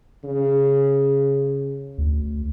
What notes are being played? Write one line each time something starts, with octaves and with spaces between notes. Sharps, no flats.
C#3
D2